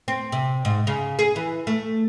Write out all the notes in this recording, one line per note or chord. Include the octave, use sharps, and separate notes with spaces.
C4
C3
G#2
C#3
G#4
E3
A3